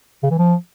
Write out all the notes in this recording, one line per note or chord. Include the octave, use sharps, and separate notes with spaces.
C#3
E3
F3